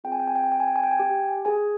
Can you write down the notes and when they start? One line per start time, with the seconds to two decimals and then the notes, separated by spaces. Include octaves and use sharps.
0.04 C4 F4 G#4 G5
0.12 G#5
0.20 G5
0.27 G#5
0.35 G5
0.44 G#5
0.52 G5
0.60 G#5
0.68 G5
0.76 G#5
0.83 G5
0.91 G#5
0.99 G4 G5
1.45 G#4 G#5